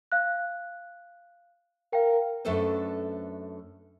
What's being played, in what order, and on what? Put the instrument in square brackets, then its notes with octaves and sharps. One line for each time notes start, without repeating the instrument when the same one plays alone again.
[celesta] F5 F#6
[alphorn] A#4 [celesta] F5 G5
[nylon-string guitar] F#2 A3 D4 A4 B4 C5